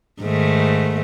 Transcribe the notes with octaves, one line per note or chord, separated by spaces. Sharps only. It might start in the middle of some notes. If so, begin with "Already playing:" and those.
G#2 D#3 A3